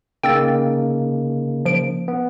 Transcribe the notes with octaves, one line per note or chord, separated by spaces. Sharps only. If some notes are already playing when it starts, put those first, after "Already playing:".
C#3 A#3 D#4 G5 E6 A6
F3 D7
B3